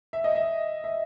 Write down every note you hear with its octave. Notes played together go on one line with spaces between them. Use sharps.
E5
D#5
E5
E5